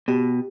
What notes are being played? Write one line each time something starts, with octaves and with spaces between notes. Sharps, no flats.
B2 G4